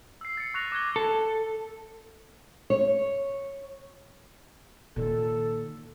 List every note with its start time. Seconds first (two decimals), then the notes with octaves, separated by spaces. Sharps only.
0.21 E6 C7
0.37 A6 C#7
0.54 C#6 F#6 A#6 F7
0.72 D6 F#6 G#6 G7
0.96 A4
2.70 C#5
4.96 A#2 D#3 A4